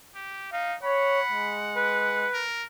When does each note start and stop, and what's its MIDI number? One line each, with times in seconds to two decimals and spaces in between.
0.15 0.52 67
0.53 0.75 63
0.53 0.75 77
0.83 1.20 73
0.83 2.28 78
0.83 1.58 83
1.31 2.27 56
1.76 2.42 71
2.34 2.64 70